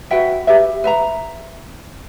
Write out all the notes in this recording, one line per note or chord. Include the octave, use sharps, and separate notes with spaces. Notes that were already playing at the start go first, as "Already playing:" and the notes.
F#4 B4 E5 G5
G4 B4 E5
B4 E5 A#5